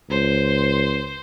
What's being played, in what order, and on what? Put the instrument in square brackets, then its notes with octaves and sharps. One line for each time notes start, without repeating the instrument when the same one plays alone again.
[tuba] C#2 [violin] C5